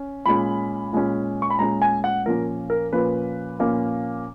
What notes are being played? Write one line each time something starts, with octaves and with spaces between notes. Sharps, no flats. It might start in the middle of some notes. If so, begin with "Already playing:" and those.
Already playing: C#4
A#2 G#3 C#4 B5
A#2 G#3 C#4
C#6
B5
A#2 G#3 C#4 A#5
G#5
F#5
A#2 F3 A#3 C#4 A#4
A#4
A#2 F3 A#3 C#4 B4
A#2 F3 A#3 C#4